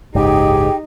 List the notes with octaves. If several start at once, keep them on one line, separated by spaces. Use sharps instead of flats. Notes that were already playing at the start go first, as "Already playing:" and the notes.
F#1 C#2 G#2 D#4 G4 G#4 G5